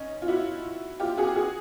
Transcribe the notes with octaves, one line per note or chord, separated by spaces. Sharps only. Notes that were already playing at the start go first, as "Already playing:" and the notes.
Already playing: C#4 D#4
F4
E4 F#4
F4 G4
F#4 G#4
F#4 G#4